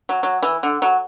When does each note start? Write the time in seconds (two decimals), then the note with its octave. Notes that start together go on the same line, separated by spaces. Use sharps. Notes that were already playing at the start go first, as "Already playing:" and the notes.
0.09 F#3
0.23 F#3
0.43 E3
0.63 D3
0.82 F#3